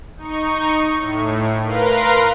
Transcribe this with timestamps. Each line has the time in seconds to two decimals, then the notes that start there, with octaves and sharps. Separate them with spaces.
0.17 D#4 C#6
0.97 A2
1.64 A#4 B4 F5 A#5 C6